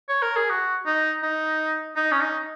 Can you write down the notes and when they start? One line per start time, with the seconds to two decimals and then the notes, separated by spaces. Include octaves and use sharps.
0.09 C#5
0.22 A#4
0.36 G#4
0.50 F#4
0.86 D#4
1.23 D#4
1.96 D#4
2.11 C#4
2.21 D#4